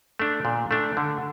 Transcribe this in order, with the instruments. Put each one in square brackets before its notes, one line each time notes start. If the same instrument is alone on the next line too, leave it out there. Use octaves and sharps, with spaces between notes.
[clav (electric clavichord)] A3 D4
A#2
A3 D4
D3